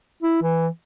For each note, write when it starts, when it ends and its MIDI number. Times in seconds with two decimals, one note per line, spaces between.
0.23 0.41 64
0.43 0.67 52